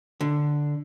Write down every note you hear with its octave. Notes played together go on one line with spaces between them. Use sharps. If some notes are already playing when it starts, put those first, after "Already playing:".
D3